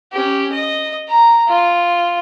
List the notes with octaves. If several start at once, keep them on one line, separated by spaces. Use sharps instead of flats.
C#4 G4
D#5
A#5
F4